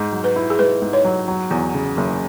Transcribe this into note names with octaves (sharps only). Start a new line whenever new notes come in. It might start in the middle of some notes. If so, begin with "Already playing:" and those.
Already playing: G#2
F#3
B4
E4
G#4
G#2 B4
G#2
C#5
F#3
F#3
E2
C#3
F#1